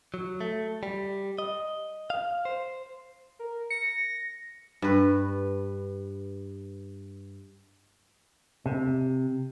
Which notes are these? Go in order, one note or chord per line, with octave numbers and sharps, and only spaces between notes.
F#3
A3
G3
D#5
F5
C5
A#4
A#6 C#7
G2 B4
C3